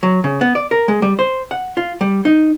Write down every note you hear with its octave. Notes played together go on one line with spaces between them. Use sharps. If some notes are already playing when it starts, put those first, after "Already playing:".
F#3
C#3
B3
D5
A#4
G#3
G3
C5
F#5
F4
G3
D#4